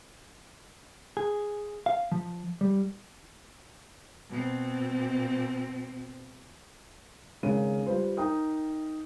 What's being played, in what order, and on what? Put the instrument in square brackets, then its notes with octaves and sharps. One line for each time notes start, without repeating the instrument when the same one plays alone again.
[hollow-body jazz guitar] G#4
F5
F3
G3
[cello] B2 C4
[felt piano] G#1 C#3 A#4 D#7
G3 F4 B4 C5
D#4 A#4 G5 D#6